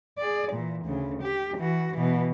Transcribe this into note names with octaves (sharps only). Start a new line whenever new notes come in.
G#4 D5
A#2 E3
D2 C#3
G4
E3 F#4
B2 E3